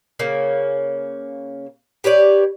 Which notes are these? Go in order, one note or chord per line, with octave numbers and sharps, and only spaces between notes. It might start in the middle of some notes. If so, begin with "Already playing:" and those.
C#3 A#3 C#4
G4 B4 C#5 D5